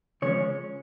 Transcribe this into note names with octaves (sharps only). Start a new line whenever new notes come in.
C#3 F3 G#3 C#4 C#5